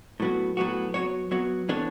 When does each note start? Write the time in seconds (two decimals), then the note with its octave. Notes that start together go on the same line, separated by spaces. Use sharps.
0.20 A2 F#3 B3 F#4
0.57 A2 F#3 B3 F#4
0.94 F#3 B3 F#4 C#5
1.31 F#3 B3 F#4 C#5
1.69 E3 B3 D4 A4 C#5